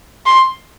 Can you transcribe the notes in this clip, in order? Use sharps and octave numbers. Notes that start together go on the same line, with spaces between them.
C6